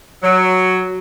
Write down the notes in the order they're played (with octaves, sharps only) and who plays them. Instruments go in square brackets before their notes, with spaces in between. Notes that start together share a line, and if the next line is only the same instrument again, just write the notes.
[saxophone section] F#3